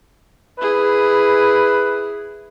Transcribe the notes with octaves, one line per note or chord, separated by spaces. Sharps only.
E4 G#4 B4